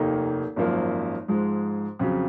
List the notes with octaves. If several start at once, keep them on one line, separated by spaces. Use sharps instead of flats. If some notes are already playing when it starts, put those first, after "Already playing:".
Already playing: F1 D#2 D#3 A#3 D#4
G#1 F#2 F3 A#3
G#2 F3 G#3
F2 C#3 F#3